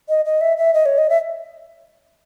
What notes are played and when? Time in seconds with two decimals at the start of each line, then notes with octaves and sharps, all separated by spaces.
0.09 D#5
0.25 D#5
0.41 E5
0.57 E5
0.74 D#5
0.86 C#5
0.98 D#5
1.10 E5